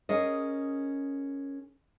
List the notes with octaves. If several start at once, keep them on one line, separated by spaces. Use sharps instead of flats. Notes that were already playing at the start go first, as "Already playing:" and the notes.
C#4 G#4 A#4 D#5